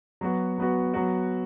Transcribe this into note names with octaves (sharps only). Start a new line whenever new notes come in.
F#3 B3 F#4
F#3 B3 F#4
F#3 B3 F#4